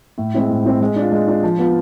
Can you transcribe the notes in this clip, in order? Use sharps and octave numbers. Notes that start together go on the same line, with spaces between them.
A2
G#3 C4 E4
A2
G#3 C4 E4
G#3
D4
F4
G#3
D4 F4
F3
B3 F4